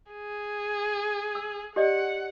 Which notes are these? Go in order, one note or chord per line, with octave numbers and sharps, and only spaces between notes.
G#4
E6
G4 D5 D#5 F#5